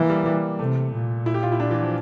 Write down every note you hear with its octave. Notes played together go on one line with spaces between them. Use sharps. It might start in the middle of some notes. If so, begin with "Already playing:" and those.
Already playing: E3 A#3
G3
G3
C3 A3
A#2
E4
G4
F4
E4
D4
E3
F3